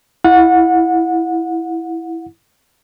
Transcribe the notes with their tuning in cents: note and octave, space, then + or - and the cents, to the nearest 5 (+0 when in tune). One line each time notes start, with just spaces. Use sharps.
E4 +0 F#5 -25